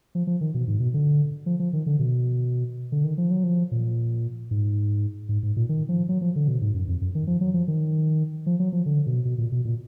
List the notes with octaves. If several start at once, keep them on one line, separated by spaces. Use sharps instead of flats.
F3
F3
D#3
B2
G#2
B2
D3
F3
F3
D#3
D3
B2
D3
D#3
F3
F#3
F3
A#2
G#2
G#2
G#2
A#2
D#3
F3
F#3
F3
D3
B2
G#2
F#2
F2
F#2
D#3
F3
F#3
F3
D#3
F3
F#3
F3
D3
B2
B2
A#2
B2
A#2